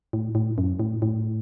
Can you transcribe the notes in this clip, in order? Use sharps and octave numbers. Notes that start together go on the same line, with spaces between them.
A2
A2
F#2
A2
A2